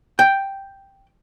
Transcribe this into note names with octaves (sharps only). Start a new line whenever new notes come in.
G5